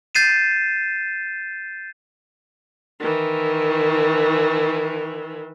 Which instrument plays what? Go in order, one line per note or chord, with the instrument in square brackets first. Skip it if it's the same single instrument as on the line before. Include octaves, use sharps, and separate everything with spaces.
[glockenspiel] G6 A6 C7 D#7 E7
[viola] D#3 E3